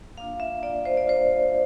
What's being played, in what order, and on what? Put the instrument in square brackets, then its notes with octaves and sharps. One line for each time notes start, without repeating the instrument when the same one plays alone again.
[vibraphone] A#3 D4 F4 F5
E5
A#3 D4 F4 D5
C5
D5
A#3 D4 F4 C5